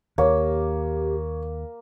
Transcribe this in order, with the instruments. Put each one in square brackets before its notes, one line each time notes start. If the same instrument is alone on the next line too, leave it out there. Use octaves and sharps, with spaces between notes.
[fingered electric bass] D#2 [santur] A#3 [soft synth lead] G4 [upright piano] C#5